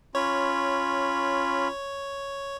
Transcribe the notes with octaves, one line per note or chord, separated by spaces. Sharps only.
C#4 F4 C#5 B5